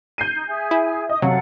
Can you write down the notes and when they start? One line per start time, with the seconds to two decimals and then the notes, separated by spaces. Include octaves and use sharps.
0.18 G6 C7 D#7
0.32 D#4
0.48 G#4 E5 G#5
0.71 E4
1.09 D#5 D#6
1.22 C3 F#3 A4 F5 F#5